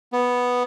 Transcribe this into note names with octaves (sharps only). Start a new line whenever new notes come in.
B3